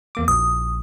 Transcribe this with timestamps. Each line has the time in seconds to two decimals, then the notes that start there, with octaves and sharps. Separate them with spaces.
0.15 E2 A#3 D6
0.28 A#1 D#6